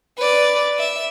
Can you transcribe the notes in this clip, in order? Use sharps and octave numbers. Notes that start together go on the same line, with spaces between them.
B4 D5
E5